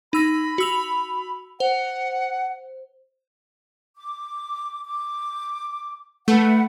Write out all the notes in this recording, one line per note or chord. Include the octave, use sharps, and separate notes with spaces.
D#4 B5 E6 A#6
F#4 E6 F7
C5 F#5
D6
D6
A3 B4 F#5